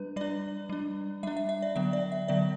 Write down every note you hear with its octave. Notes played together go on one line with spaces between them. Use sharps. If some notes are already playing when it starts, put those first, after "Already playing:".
Already playing: G3 D4 B4
G3 D4 D5
G3 D4
G3 D4 E5
E5
E5
D5
D3 F#3 B3 E5
D5
E5
D3 F#3 B3 D5